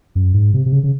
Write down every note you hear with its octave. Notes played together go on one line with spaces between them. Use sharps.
F#2
G#2
C3
C3
C#3
C#3